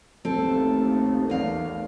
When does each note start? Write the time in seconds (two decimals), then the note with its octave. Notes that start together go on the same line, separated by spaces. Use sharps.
0.25 A1 D#2 A3 C4 A4
1.30 E2 F5